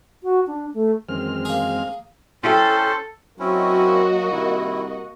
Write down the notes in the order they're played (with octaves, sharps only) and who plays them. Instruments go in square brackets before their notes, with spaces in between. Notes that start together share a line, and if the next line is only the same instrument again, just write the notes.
[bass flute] F#4
D4
A3
[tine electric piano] F#2 D#3 E3 [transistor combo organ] G#3 C4 F6
[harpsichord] A#3 G#4
[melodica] C#4 C5 C6 [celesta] E4 E5 G5 [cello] A4
[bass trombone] F#3 [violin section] A#3 F#4 D#5 [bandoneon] C4 C#4 E4
[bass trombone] C2 [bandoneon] D#3 E4